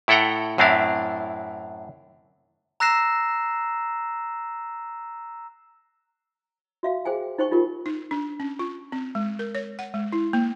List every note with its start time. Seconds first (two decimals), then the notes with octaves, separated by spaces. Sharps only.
0.08 A2 E4 A4 F#5 G5 A#5
0.58 F#2 A2 C4 D4 E4 F5
2.80 A#5 E6 F#6 A#6 C7 E7
6.83 F#4 E5 F5
7.05 G#4 C5 G5 G#5
7.38 D#4 C5 G5 C#6
7.51 D#4 F4 G4 A#4
7.86 D#4
8.11 D4
8.40 C#4
8.59 F4
8.92 C4
9.15 G#3
9.39 A#4
9.55 C#5
9.79 F#5
9.94 G#3
10.12 E4
10.33 A#3